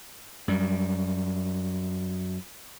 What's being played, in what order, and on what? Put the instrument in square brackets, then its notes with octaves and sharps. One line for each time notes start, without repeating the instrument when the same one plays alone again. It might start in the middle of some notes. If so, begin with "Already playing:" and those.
[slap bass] F#2 G3